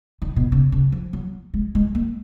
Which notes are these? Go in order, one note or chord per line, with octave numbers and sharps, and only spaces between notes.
D#3
B2
C#3
C#3
F3
F#3
G#3
G#3
A#3